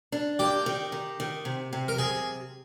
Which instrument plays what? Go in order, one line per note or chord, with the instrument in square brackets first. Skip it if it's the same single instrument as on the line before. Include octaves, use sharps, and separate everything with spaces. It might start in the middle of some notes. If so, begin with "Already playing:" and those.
[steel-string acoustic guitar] D4
[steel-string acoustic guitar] A#3 [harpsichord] G4
[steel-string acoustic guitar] D#3
D#3
D#3
C3
C3
[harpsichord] A#4
[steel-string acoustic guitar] C3 [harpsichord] G#4